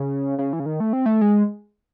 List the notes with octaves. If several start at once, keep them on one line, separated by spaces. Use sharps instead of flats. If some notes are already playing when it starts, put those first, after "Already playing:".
Already playing: C#3
C#3
E3
C#3
D#3
A3
C4
A3
G#3